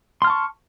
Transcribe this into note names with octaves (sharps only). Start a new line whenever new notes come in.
A5 C6 C#6 F6